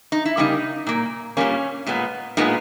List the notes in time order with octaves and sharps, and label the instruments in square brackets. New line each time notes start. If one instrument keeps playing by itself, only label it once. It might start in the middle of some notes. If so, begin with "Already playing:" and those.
[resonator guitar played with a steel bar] D#4
E4
C#3 G3 A#3 D#4
A#2 A#3
A#2 G3 A#3 C#4
A#2 G#3 B3
A#2 G#3 B3 D#4